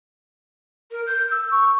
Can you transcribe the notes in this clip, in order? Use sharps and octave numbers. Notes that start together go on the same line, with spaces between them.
A#4
G6
E6
C#6